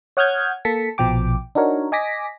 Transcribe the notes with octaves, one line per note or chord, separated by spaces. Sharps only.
C#5 F#5 D#6 F6 G6 G#6
A#3 A4 A5 B6 C#7
A#1 B2 F3 G5 D6
D4 D#4 F#4 A#4 C#5
D#5 G#5 D6 A#6 B6